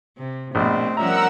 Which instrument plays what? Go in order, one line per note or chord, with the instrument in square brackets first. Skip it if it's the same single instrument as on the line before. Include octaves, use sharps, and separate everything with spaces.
[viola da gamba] C3
[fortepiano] A#1 B2 [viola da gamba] A3 [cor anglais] C4
[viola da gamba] F3 G3 C#4 [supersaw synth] A#4 F#5 E6 [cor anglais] E5 [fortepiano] A#5